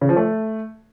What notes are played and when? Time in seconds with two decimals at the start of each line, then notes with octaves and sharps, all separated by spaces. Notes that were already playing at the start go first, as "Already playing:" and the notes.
0.01 C#3
0.09 F3
0.16 A3